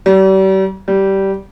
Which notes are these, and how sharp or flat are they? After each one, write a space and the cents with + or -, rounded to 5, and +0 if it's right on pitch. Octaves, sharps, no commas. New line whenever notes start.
G3 -40
G3 -15